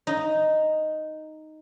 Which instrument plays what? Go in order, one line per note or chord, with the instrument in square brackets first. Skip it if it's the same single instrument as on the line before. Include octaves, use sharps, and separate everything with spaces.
[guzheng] D#4